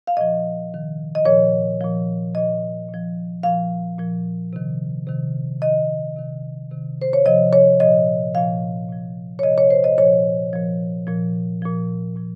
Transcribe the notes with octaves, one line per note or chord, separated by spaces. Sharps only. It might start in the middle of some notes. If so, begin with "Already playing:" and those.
F5
A#2 F3 D#5
C3 D#3
D#5
A#2 F3 C#5
A#2 F3
A#2 F3 D#5
A#2 F3
A#2 F3 F5
A#2 F3
C3 D#3
C3 D#3
C3 D#3 D#5
C3 D#3
C3 D#3
C5
C#5
C3 F3 D#5
C#5
A#2 F3 D#5
A#2 F3 F5
A#2 F3
C#5
C3 F3 D#5
C#5
C5
D#5
A#2 F3 C#5
A#2 F3
A#2 F3
A#2 F3
A#2 F3